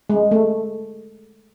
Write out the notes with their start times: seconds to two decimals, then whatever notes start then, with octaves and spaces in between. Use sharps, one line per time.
0.10 G#3
0.31 A3